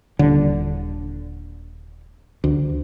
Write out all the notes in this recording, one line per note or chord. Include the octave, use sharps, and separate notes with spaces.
D#1 D3
D2